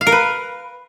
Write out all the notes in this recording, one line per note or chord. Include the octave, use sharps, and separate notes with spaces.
F5
A#4
B4